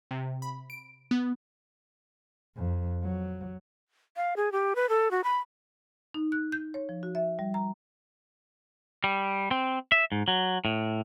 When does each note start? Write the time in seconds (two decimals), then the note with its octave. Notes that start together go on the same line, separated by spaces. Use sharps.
0.11 C3
0.42 B5
0.70 D7
1.11 B3
2.56 F2
3.03 F#3
4.17 F5
4.36 G#4
4.52 G4
4.76 B4
4.89 A4
5.11 F#4
5.24 B5
6.14 D#4
6.32 F#6
6.52 G6
6.74 C#5
6.89 F3
7.03 F#4
7.15 E5
7.39 G3
7.54 A#5
9.04 G3
9.51 C4
9.92 E5
10.12 G#2
10.28 F#3
10.65 A2